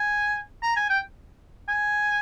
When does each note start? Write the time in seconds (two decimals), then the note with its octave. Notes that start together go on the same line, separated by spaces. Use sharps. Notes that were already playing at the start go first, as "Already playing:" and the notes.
Already playing: G#5
0.63 A#5
0.76 G#5
0.90 G5
1.68 G#5